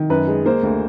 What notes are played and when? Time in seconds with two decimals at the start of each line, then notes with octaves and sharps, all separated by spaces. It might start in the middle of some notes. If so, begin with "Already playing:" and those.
Already playing: D#3
0.10 F#2 B4
0.28 G#3
0.46 A#3 C5
0.63 D2